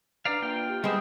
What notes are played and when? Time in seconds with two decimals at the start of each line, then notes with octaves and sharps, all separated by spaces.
0.25 D4 B4 D5 F5 A#5
0.42 A#3 F4 G5
0.70 G4
0.84 G3 G#3 B3 C4 E5 G5 D#6 G6